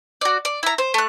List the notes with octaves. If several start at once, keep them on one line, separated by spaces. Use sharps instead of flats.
F#4 D5
D5
E4 A#5
C5
A3 F#6